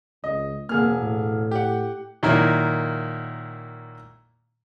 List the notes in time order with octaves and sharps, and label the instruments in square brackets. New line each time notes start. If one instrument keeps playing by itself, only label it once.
[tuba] C#2 [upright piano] D#5
[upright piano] E1 G#4 F6 [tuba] A#3
[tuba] A2
[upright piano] G4 F#5
[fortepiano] A#2 D#3 F#3 A#3 E4